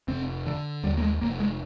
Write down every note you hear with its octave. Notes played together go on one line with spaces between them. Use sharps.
F1 C4
D3
D#2 G3
A#3
G#3
F1 A#3
G#3